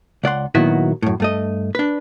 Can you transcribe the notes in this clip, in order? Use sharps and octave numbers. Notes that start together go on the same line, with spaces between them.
C#2 D5 F#5 C6
A#2 D#3 F#3 B3 E4 F#4
F#2 A2
G2 A3 D#5
D4 B4